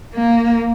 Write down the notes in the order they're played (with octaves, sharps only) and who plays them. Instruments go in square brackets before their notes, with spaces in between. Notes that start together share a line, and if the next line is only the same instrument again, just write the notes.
[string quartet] A#3